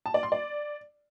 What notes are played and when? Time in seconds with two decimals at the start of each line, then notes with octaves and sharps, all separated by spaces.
0.06 A5
0.14 D5
0.23 C6
0.32 D5